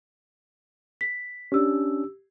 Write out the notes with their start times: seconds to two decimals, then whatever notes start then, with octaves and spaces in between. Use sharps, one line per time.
1.01 B6
1.52 C#4 D4 G4 E6